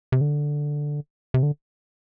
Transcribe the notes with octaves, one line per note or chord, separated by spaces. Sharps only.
C3
D3
C3
D3